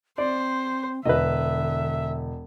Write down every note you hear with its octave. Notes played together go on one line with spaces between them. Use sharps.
C4 C5 D5
E1 D3 B4 D#5 E5